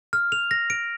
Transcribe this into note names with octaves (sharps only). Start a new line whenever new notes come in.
F6
F7
A#6
D7